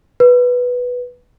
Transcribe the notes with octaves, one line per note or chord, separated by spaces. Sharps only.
B4